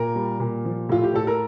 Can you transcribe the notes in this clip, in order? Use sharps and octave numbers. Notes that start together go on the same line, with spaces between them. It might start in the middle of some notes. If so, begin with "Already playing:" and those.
Already playing: A#2 A#4
G3
A#2
F3
A2 F4
G4
A2 A4
A#4